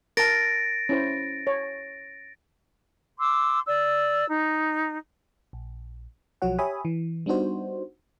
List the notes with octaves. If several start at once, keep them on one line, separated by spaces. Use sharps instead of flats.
A#4 A5 A6 A#6 D7
C#4 E4 C5
C#5
C6 D6 E6
D5 E6
D#4
A#1
B1 F3 F#3 F#4 C#5 F#5
G4 C#5 E5 G#5 B5 D#6
E3
G3 B3 D4 D#4 F#4 C5